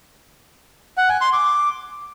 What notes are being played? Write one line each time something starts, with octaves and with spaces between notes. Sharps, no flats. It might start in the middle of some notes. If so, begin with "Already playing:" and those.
F#5
G#5
C6
D6